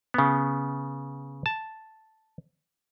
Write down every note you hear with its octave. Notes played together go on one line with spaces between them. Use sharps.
C#3 B3
A5